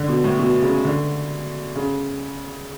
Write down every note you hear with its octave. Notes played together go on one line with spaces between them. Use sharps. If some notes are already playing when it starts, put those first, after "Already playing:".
Already playing: D3
B2
A2
B2
C#3
D3
C#3